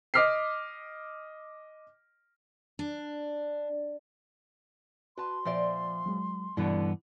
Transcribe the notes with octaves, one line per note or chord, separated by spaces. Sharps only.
D#5 D6 F6 B6 C7
D4
F#4 B4 A5 C6
A#2 F3 C5 D5 E5
F#3 G#3
G2 B2 D3 E3 B3 E4